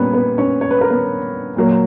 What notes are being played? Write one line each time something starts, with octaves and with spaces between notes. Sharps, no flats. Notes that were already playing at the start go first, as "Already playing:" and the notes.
Already playing: A#2 G3 A#3 B3 C#4 B4 C#5
B3 B4
C#4 C#5
C#5
B4
A#4
B3 B4
A#2 F#3 A#3